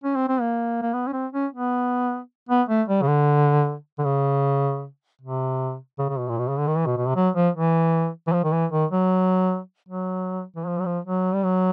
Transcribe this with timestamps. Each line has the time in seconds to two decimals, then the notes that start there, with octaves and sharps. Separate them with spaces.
0.04 C#4
0.16 C4
0.28 C4
0.41 A#3
0.82 A#3
0.93 B3
1.07 C#4
1.13 C4
1.33 C#4
1.52 B3
2.49 B3
2.69 A3
2.88 G3
3.02 C#3
3.07 D3
3.99 D3
4.05 C#3
5.21 C3
5.99 C#3
6.09 C#3
6.19 B2
6.28 A#2
6.38 B2
6.48 C#3
6.58 D3
6.67 D#3
6.77 E3
6.86 B2
6.97 B2
7.06 C3
7.16 F#3
7.36 F3
7.55 E3
8.27 E3
8.32 F3
8.44 D#3
8.52 E3
8.72 D#3
8.91 F#3
9.89 F#3
10.56 E3
10.66 F3
10.79 F#3
10.85 F3
11.05 F#3
11.34 G3
11.44 F#3